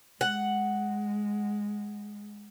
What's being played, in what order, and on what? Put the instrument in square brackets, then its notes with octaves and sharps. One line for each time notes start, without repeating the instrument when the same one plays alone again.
[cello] G#3 [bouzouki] F#5